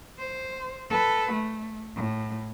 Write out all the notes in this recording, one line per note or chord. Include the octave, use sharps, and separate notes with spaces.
C5
A4 B4
A3
A2